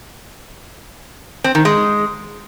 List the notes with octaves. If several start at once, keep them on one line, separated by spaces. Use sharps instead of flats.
C4
D#3
G#3